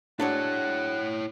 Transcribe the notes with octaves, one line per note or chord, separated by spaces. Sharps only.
F#3 G#3 D4 E4 C#5 F#5